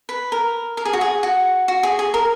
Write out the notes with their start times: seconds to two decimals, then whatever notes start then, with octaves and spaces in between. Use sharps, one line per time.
0.09 B4
0.32 A#4
0.77 A#4
0.85 G#4
0.93 F#4
1.01 G#4
1.23 F#4
1.68 F#4
1.83 G#4
1.99 G#4
2.14 A#4